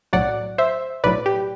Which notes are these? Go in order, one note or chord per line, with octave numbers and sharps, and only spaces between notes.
B1 A2 F#3 D5 F#5
C5 E5
B1 A2 F#3 B4 D5
G4